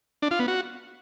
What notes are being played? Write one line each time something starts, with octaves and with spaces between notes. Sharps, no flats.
D4
F4
B3
F#4